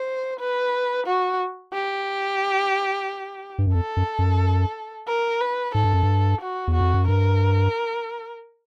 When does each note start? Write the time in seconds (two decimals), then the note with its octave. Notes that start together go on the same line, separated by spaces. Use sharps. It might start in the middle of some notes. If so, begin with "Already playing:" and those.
Already playing: C5
0.40 B4
1.07 F#4
1.74 G4
3.58 G2
3.67 F#2
3.74 F2 A4
3.97 F#2
4.19 F#2
5.08 A#4
5.41 B4
5.75 G#2 A4
5.84 G2
5.93 F#2
6.03 G2
6.41 F#4
6.68 E2
6.74 F#4
6.81 F2
6.94 F#2
7.08 G2 A#4